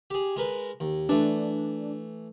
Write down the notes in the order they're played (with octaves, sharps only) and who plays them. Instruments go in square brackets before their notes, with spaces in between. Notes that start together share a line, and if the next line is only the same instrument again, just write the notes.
[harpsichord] G4 G#4
G#3 A#4 B4
D#2
[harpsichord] E3 A3 [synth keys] D4